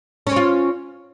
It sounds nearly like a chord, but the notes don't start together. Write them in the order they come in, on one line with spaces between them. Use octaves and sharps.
C#4 C4 F4